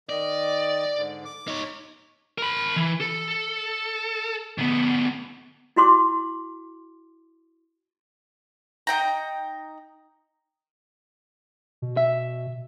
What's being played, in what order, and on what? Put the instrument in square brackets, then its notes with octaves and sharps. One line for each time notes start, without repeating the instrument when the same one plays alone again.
[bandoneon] D#3 D#5 [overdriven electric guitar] D5
[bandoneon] G#2 D3
D6
[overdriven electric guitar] D#4 C#5
[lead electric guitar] A#4 B5
E3
A4
D2 B3
[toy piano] E4 F#4 C6 D6
[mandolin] D#4 G5 A#5
[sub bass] B2
[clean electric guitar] E5